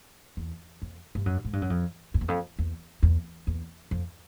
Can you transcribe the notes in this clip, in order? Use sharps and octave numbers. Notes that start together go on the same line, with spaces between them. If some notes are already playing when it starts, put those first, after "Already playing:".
E2
F2
G2
F#2
G#2
G2
F#2
F2
F2
E2
F2
E2
E2
E2
F2